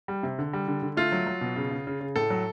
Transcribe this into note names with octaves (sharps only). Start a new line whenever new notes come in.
G3
C3
D3
G3
D3
D3
A3 F4
F#3
F#3
B2
C#3
C#3
C#3
C#3
A2 A4
F#3